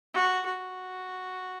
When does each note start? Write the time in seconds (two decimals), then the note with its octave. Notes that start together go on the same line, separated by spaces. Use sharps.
0.14 F#4
0.46 F#4